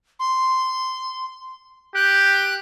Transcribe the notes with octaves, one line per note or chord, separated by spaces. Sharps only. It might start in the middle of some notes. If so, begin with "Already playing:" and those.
C6
G4 F#6